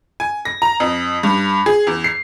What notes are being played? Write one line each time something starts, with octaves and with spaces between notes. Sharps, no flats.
G#5
A#6
A#5
F2
G2
G#4
E2
C7